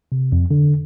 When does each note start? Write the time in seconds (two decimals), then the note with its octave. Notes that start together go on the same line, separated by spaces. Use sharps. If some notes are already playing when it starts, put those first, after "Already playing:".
0.12 C3
0.32 F2
0.51 D3